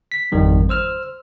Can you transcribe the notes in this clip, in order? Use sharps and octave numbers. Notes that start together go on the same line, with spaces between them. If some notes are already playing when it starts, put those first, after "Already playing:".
B6
G#1 F2 D#3 G3
C5 E6 F6